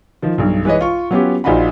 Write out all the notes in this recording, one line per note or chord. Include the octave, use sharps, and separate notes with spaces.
D#3 F3
B1 G2
E3 G#3 B4 C#5 D#5
F4 C#6
F#3 B3 C#4 F4 G4
A#1 D#4 F4 F#4 B5